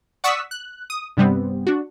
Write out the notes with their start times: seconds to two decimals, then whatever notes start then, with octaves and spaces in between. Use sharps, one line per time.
0.24 D5 F#5 C#6 D#6 E6 B6
0.51 F#6
0.90 D#6
1.17 G2 C3 G3 B3 C4
1.67 D4 F#4